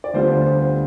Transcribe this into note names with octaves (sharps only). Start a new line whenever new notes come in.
D5
D2 D3 G3 B3 F4 C5
C5